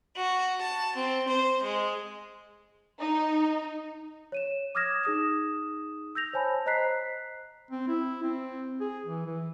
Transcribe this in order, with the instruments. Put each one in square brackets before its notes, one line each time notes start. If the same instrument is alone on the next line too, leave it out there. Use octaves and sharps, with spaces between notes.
[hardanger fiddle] F#4
A5
C4
C5
G#3
[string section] D#4
[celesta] C#5 D#7 E7
D6 D#6 F6 G#6 A#6 E7
D#4 G#4 D#6 E7
E6 G6 A#6 F7
C5 C#5 G#5 A5 B5
C5 D#5 A#5 F#6 B6 C7
[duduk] C4
E4
C4
G#4
E3
E3